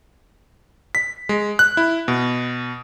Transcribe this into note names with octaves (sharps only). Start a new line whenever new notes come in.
B6
G#3
F#6
E4
B2